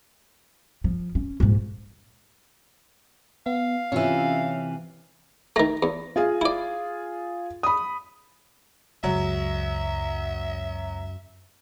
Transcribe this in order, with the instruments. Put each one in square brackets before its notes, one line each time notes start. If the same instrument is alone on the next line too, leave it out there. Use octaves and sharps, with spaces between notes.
[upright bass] F3
C#4
A#1 G#2
[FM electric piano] B3 [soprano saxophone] F5
[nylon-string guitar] C3 E3 [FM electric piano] C#4 F4 E5
[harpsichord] D#3 A3 [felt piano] A#6
[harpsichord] E2
[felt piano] F4 G#4 F5
[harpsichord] E4 D5
[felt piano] B5 D#6
[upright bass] C#2 [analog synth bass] F#2 [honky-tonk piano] F#3 [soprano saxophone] E5